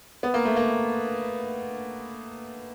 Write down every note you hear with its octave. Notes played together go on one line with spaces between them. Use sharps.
B3
A#3
A3
A#3